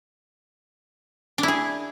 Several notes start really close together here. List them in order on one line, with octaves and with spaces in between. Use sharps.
D4 E4 G#4